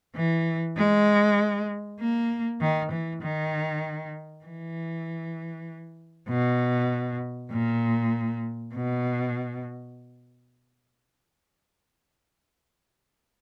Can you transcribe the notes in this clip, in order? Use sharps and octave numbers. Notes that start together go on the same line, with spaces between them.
E3
G#3
A#3
D#3
E3
D#3
E3
B2
A#2
B2